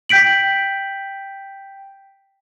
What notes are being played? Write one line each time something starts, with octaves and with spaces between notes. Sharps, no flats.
G5 G6 B6 D7 F#7